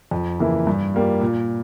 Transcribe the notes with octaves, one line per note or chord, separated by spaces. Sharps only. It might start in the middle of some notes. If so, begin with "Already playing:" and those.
F2
C#3 E3 A#3 E4
G2
G3 A#3 F4
A#2